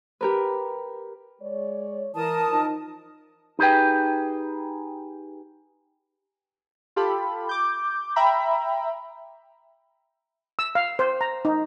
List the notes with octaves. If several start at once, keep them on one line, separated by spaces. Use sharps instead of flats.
G4 A#4 B4
G#3 C#5 D5
E3 A#4 A5 D#6
F3 D#4
D#4 G4 G#4 B4 G5
F4 G4 A4 B5
D6 G6
E5 G5 A#5 B5
E6
F5
C5
A#5
D#4